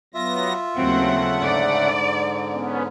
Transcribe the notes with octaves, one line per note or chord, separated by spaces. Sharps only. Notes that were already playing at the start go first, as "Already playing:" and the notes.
F#3 B3 F4 E5 A#6
D#2 C#3 F#3 A3 C4 F#5
G#2 D3 D5
B3 C#4